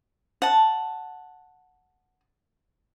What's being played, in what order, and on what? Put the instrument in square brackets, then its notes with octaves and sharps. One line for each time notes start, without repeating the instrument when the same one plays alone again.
[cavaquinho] F#5 A5